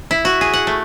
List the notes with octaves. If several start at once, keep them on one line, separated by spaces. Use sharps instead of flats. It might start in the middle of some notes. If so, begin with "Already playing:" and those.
E4
F#4
G#4
F#5
A3